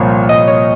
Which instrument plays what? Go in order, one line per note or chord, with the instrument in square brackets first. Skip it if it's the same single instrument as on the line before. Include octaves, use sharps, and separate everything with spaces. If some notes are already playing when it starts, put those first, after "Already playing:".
Already playing: [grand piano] C2 A#2 F3 A#3 [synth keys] C#5
[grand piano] C2 [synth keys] D#5
[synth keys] C#5